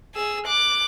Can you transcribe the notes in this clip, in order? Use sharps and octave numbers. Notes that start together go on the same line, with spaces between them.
G#4 E6
D6 F#6